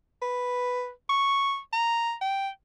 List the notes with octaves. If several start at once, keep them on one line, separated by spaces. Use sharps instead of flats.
B4
C#6
A#5
G5